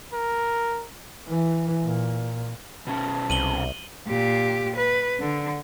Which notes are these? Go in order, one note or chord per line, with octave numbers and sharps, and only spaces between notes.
A#4
E3
A#2
B2 C#4 A5
C2 D#7 F#7 G7
A#2 G4
B4
D3